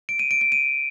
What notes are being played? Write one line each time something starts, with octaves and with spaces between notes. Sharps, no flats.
D7
D#7
D7
D7
D#7